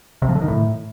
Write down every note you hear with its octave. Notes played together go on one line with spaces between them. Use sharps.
C3
F3
D3
D#3
A2